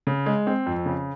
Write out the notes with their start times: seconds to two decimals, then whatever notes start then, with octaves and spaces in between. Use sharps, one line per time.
0.07 C#3
0.26 G#3
0.47 C4
0.66 F2
0.86 C#3